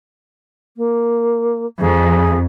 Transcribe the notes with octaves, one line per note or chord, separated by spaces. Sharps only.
A#3
F2 G#4